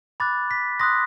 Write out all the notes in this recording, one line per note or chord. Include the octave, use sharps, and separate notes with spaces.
B5 D6 F#6 A6
B6
C6 D#6 F#6 A#6